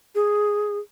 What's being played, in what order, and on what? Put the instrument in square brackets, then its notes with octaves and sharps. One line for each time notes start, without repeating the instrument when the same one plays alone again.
[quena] G#4